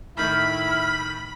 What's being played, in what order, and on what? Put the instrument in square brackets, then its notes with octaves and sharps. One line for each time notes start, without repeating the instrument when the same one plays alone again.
[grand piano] A2 D#3 A3 [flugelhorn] E4 [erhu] B5 [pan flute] F6